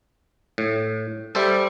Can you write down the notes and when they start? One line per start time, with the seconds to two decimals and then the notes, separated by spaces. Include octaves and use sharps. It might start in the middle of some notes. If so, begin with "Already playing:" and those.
0.58 A2
1.35 G3 A4 C5 E5